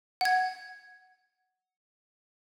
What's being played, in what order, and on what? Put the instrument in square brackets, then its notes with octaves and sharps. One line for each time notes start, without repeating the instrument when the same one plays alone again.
[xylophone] F#5 G#6